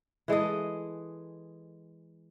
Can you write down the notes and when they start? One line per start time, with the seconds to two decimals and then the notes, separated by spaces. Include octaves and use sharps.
0.28 E3 G#3 A4 D#5